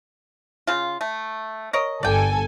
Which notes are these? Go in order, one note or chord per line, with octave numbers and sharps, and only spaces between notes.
C#3 F4
A3
A#4 C#5 D#5
G1 A4 D5 G5 G#5